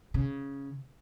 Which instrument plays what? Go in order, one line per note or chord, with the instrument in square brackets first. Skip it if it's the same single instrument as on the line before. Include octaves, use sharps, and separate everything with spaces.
[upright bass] C#3